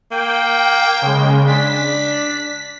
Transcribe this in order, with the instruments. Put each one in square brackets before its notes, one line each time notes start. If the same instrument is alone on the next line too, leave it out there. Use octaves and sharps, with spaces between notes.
[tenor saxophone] A#3 [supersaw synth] G5
[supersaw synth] C#3 G#3
[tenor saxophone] D4 [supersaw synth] B6